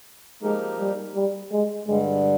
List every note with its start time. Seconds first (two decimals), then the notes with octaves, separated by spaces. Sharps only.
0.42 F3 G#3 A#3 D#4 G4 A#4
0.79 G3
1.15 G3
1.52 G#3
1.87 G2 D3 G3 G#3